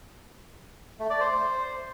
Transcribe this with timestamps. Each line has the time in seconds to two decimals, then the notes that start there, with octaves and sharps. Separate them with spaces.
1.00 A3
1.10 D5
1.20 C5